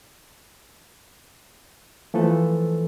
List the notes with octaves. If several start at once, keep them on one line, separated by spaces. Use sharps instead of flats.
E3 F3 A3 A4 B4